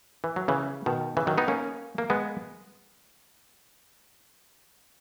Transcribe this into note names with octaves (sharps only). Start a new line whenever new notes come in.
E3
F#3
C#3 E3
B2 D#3
C#3 E3
D#3 F#3
B3 D#4
A#3 C#4
A#3
G#3 B3